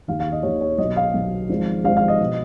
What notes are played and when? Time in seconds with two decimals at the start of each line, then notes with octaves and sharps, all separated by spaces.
0.08 D#2 D#3 F5
0.20 F5
0.32 D#5
0.43 D#2 D#3 C#5
0.61 C#5
0.78 B1 B2 D#5
0.96 F5
1.14 B1 B2
1.49 G#1 G#2 F3
1.84 G#1 G#2 F3 F5
1.97 F5
2.08 D#5
2.21 B2